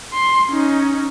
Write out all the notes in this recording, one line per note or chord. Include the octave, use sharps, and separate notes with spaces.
C6
C#4 D#4